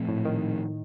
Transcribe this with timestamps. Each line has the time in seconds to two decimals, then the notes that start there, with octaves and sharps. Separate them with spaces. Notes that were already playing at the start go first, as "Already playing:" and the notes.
Already playing: A#2 F3 A3 C4
0.08 A2
0.25 D#3